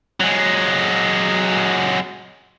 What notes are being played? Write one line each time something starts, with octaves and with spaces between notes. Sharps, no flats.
F#3 G#3